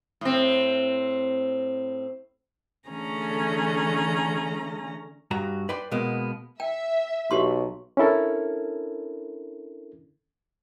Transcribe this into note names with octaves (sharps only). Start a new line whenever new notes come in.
A2 C4
D3 E3 A3 C#4 G#4 A#5
G2 F#4 A#5
B4 D5 G5 B5 C6
B2 G#3 A#3 B3
E5 G5
B1 F#4 G4 C6
C#4 D4 E4 A4 A#4